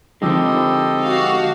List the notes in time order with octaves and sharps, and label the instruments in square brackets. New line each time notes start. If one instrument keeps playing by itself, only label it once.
[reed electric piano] D3 F3 D#4 [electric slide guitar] G#3 C4 [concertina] G4 A4 D#5
[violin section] F#4 F5